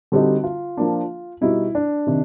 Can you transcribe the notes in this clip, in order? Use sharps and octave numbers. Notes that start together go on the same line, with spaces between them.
D3 G3 C4 D#4 F#4 G4
F4
F3 A#3 D4
B2 G3 B3 D#4 E4 F#4
D4
C3 D#3